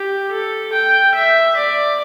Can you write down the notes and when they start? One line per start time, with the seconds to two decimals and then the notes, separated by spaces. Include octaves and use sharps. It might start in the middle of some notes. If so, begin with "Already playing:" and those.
Already playing: G4
0.31 A4
0.73 G5
1.14 E5
1.56 D5